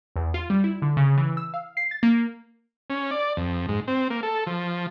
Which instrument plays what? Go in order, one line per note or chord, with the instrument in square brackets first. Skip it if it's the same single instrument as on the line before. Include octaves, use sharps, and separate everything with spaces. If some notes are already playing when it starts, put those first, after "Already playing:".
[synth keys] E2
F4
G3
E4
D3
C#3
E3
E6
F5
C7
A6
A#3
[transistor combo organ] C#4
D5
F2
G#2
C4
A#3
A4
F3